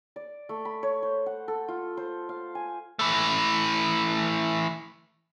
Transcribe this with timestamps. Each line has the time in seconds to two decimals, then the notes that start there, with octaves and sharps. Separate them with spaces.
0.16 D5
0.49 A3
0.65 B5
0.83 C#5
1.03 C5
1.26 F#5
1.48 A4
1.68 F4
1.97 C5
2.29 F5
2.55 G#5
2.99 E3 A3